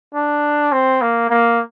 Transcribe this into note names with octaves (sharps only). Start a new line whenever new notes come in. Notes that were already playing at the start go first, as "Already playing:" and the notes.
D4
C4
A#3
A#3